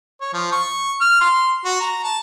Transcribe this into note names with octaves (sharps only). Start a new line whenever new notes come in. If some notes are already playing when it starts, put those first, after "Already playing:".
C#5
F3
C#6
F6
C6
F#4
A#5
A5